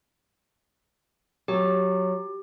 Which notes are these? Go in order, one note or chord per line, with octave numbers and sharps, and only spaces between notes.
F#3 G4